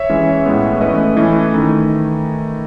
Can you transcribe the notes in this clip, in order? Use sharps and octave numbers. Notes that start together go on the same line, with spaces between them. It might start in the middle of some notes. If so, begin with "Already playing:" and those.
Already playing: C#5 E5
E3 G#3 C#4
A2 G#3 B3
E3 A3 C#4 B4 D#5
E3 A3 C#4
D#3 A3 D#4